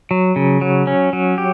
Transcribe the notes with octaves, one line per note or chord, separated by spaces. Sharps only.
F#3
C#3
F#3
C#4
F#3
G4